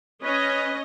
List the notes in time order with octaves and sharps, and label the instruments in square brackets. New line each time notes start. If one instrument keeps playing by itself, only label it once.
[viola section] C#4 D#5 [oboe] B4